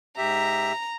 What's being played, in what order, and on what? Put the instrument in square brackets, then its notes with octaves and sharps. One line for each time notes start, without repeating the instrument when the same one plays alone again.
[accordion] G#2 G4 E5 [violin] A#5